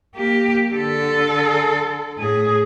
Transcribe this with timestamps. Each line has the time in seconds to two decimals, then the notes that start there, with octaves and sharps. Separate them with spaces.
0.15 A#3 G4
0.73 D3 A4
2.19 A2 G#4